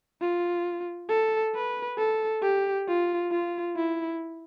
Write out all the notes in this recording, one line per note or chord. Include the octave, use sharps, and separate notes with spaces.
F4
A4
B4
A4
G4
F4
F4
E4